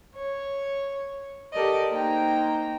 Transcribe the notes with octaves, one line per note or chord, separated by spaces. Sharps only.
C#5
G4 A4 A#4 D5 D#5
A#3 D#4 C5 G5 A#5